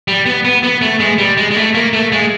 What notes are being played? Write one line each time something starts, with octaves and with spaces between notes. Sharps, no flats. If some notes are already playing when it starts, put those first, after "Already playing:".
G3
B3
B3
B3
A3
G#3
G3
G#3
G#3
A3
A#3
A3
G#3